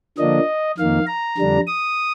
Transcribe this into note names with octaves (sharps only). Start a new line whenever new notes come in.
D3 F3 A#3 D4 D#5
F2 D#3 A#3 F5
A#5
F2 D3 G3 D4
D#6